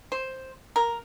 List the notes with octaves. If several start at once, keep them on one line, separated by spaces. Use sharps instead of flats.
C5
A#4